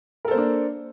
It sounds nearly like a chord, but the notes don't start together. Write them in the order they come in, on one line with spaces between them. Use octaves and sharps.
A#4 A4 C5 A#3 D4